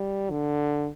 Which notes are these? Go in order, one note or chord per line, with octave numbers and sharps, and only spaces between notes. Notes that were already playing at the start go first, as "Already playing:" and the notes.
Already playing: G3
D3